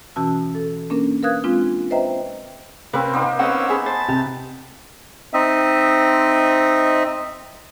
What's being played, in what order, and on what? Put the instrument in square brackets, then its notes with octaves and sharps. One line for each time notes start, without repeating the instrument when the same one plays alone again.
[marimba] B2 E3 C#4 F#4 A5 E6
A4
A#3 C#4 D4 A#4
A#4 B4 F5 D#6 F#6 G#6
G#3 C4 D4 F4
B4 C5 D#5 E5 G5 A#5
[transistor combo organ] C3 [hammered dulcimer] A#3 C4 [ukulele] C#4 B4
[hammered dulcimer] A#3 B3 D#4
[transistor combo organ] C4 C#4 E6 [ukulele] B4 D#5 F#5
[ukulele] G#4 [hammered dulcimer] G#5 B5
[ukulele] C5 [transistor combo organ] A5
[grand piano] C3 [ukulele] G4
[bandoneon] C4 D#4 D#5 E5